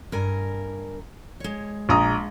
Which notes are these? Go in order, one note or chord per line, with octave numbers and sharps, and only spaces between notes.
G2 A#4 G#5
G#3 C#5
A#1 A#5 D#6